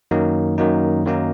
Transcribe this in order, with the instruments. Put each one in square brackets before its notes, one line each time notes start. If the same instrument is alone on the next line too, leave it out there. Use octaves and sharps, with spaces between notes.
[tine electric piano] F#2 D#3 F#3 A#3 D#4
F#2 D#3 F#3 A#3 D#4
F#2 D#3 F#3 A#3 D#4